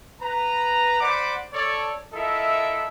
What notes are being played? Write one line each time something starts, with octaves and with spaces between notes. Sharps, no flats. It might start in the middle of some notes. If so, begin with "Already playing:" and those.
B4 A#5
C5 D5 F#5 B5 D6
A4 C#5 D5
E4 F4 A4 A#4 D#5 E5